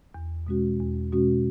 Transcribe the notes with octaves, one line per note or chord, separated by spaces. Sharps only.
E2
B2 G#3 C#4 F#4
E2
B2 G#3 C#4 F#4